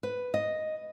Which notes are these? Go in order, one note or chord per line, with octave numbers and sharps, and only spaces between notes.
B4
D#5